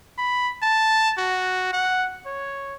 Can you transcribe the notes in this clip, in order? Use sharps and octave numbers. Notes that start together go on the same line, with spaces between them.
B5
A5
F#4
F#5
C#5